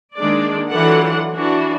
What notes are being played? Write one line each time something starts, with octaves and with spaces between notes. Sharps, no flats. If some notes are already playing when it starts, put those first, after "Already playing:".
D#3 G#3 A#3 D4 D5
E3 F#3 D4 F4 A4 F#5
E3 D4 F#4